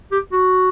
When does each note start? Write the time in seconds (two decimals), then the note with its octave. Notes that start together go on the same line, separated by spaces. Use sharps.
0.12 G4
0.32 F#4